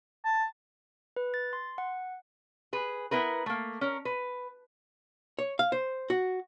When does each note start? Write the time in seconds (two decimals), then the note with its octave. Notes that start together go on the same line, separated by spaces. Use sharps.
0.24 A5
1.16 B4
1.34 A6
1.53 C6
1.78 F#5
2.73 G#4 B4
3.11 B3 E4 A#4 B4
3.46 A3 A#3
3.81 C#4 A#4
4.05 B4
5.39 C#5
5.59 F5
5.72 C5
6.10 F#4